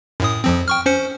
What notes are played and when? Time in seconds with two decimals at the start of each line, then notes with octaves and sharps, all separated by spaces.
0.20 F#2 A2 D#6
0.44 F2 F3 C4
0.68 G5 C#6 F6
0.86 C#4 C5 C#7